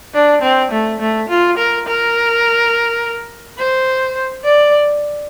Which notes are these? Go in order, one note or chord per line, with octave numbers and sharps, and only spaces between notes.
D4
C4
A3
A3
F4
A#4
A#4
C5
D5